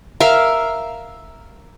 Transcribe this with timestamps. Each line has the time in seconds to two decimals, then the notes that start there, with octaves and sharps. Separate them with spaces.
0.20 A#4 E5 F5